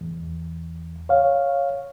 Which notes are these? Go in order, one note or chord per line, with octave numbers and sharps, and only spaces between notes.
E2
C#5 F5